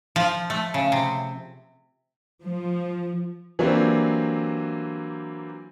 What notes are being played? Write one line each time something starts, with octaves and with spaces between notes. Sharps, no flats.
F3
A3
C#3
C3
F3
E3 F#3 A#3 C4 D4 G4